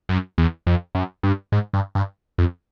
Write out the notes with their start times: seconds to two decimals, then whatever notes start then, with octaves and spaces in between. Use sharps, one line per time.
0.09 F#2
0.38 E2
0.67 F2
0.95 F#2
1.23 G2
1.52 G#2
1.74 G2
1.95 G2
2.38 F2